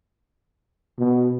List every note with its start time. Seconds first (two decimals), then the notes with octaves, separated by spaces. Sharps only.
0.99 B2